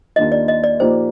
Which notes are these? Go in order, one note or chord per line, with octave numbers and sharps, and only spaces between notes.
D#2 D#3 A#3 D4 F4 D#5
D5
D#5
D5
A#2 F3 A#3 D#4 G4 C5